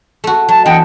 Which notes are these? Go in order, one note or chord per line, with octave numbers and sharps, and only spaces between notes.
A3 F#4
F#3 A5
E3 B3 D4 D#5 F#5 G5